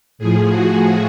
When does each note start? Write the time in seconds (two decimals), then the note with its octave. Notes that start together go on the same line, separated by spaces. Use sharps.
0.18 A2 F3 G#4
0.50 F#4